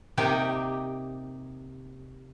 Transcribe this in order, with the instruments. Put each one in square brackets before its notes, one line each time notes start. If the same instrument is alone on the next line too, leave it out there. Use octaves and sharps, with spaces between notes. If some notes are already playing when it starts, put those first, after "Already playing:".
[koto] C3 A#3 D#4 G4